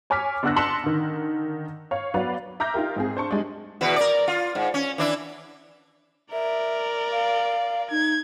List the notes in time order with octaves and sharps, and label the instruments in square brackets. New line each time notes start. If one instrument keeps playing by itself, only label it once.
[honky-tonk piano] C#5 G#5 D6 F6 B6
G1 D4 F#5 E6 F#6 A#6
A5 C6 B6 C#7 E7 F#7
D3 D#3
C#5 F5
F#3 B3 F#4 B4 D5 F5
E5 A#5 D6 F6 G6 A#6
D#4 F4 G4 A#4
G#2 C4 G#4
D4 C5 A5 C#6
G3 G#3 D4
[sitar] E2 B2 B4
A#4 D5
F4
G#2
C#4
E3 D4 E4
[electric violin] A#4 D5 [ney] E5
[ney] F5
[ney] D#4 [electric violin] G#6